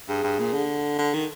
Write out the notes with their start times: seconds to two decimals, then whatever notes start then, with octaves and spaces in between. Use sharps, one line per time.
0.09 G2 G#4
0.23 G2
0.39 A#2
0.54 D3
0.98 D3
1.14 D#3